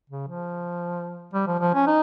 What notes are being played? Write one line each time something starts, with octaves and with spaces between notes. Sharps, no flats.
C#3
F3
G3
F3
F3
C#4
D#4